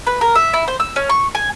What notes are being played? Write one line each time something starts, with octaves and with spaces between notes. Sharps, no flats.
B4
A#4
E5
E4
C5
E6
C#4
C#6
G#5